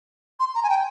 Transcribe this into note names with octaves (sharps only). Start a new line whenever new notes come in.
C6
A#5
G#5
G5